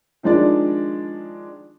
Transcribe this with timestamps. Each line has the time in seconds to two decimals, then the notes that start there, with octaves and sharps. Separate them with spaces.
0.23 D#3 F3 G#3 D4 D5